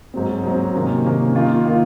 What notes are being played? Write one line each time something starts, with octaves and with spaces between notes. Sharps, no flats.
G#2 F#3 C4
G#2 F#3 C4
C3 D#3 A#3 C#4
C3 D#3 A#3 C#4
D#3 A#3 F4
D#3 A#3 F4